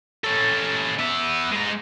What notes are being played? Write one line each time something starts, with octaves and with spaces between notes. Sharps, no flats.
C#4 A4
B3 E5
G#3 A#5